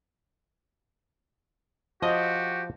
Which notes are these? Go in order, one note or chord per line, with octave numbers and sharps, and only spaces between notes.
F3 F#4 G4 D#5